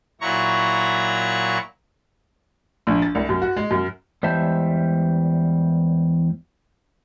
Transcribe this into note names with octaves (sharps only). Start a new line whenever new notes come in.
A#2 F#3 E4 A#5 C#6
A#1
A6
C2
F#2
F#4
G#3
F#2
E2 G3 G#3 C5 E5 A5